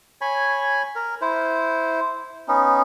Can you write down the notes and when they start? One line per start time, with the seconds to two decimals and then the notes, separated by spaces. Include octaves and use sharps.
0.21 C#5 G#5 B5
0.96 A#4
1.21 E4 C5
2.48 B3 C#4 D#4